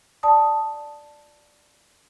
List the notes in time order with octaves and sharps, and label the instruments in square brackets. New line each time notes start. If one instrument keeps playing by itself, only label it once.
[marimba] D5 A5 D#6